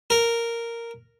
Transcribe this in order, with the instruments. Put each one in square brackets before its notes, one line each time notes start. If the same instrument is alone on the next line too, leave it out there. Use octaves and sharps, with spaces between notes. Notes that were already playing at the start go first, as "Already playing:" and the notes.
[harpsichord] A#4